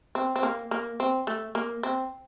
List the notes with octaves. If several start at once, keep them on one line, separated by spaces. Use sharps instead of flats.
C4
C4
A#3
A#3
C4
A3
A#3
C4